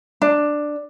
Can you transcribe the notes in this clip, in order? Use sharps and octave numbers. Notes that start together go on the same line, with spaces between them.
D4